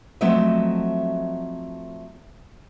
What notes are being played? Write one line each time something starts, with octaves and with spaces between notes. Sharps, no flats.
F3 F#3 A3 C4 D#5 E5